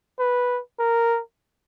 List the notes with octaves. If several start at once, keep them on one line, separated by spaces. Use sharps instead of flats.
B4
A#4